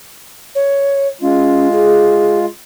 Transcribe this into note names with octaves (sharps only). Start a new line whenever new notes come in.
C#5
G#3 C#4 F4
G#4